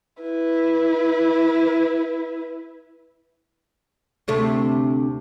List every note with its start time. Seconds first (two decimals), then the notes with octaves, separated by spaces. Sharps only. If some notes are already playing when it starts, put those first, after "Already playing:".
0.22 E4 B4
4.28 D2 C3 A3